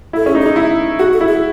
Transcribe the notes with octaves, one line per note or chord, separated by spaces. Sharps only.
E4 A4
C#4 G#4
D#4
G#4
D#4
E4
F#4 G#4
A4
E4
G#4